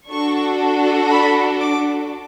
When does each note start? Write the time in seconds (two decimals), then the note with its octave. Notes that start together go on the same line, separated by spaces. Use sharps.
0.10 D4 F#4 A4 C#6
1.10 B5
1.60 D6